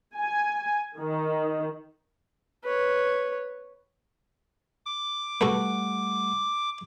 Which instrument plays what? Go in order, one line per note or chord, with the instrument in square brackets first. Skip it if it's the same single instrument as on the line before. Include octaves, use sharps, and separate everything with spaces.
[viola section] G#5
D#3
[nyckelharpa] B4 C#5
[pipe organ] D6
[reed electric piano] G3 A3 F#5 [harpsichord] F#4 A4 B4